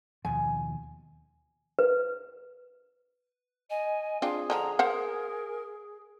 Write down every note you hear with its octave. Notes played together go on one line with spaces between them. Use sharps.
D#2 B2 F3 G#5
B4
D#5 G#5
C4 D4 F4 G#4 F5
D3 F3 A#5
A#4 C5 F5 F#5